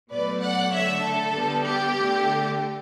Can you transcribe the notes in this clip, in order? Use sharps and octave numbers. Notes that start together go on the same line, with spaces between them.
B2 F#3 A3 B4 D5
D5 F#5
D3 A3 C#5 E5
A4
D3 G3 B3
G4
D3 A3